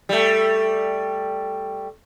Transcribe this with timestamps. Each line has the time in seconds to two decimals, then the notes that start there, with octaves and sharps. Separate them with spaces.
0.09 G3 A3